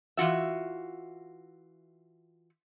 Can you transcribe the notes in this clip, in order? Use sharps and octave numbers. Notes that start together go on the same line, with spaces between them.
E3 F4 F#4 E5